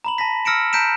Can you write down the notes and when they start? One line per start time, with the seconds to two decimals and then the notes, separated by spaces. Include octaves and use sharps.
0.04 A#5 B5 F#7
0.18 A5 A#6 B6
0.45 E6 F6 A#6 C#7 D7 E7
0.73 A5 A#5 G6 B6 D7 E7